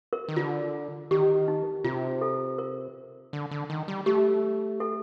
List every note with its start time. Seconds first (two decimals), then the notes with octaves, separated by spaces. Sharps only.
0.13 A#4
0.29 D#3
0.36 D3 F4
1.11 D#3 G4
1.48 D#4
1.84 C3 F4
2.22 A4
2.58 A#4
3.33 D3
3.51 D3
3.70 D#3
3.88 G3
4.06 A3 G4
4.80 A4